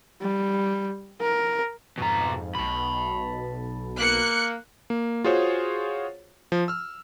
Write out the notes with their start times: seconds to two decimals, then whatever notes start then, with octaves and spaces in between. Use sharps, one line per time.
0.22 G3
1.21 A#4
1.98 F2 G#2 B2 A#5
2.55 B1 B2 A5 B5
3.98 A#3 F#6 C#7
4.90 A#3
5.24 F4 F#4 G#4 C5 C#5
6.52 F3
6.68 E6 F6